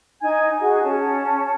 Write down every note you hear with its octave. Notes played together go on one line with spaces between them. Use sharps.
D#4 G#5 G#6
F#4 G#4
C#4 A5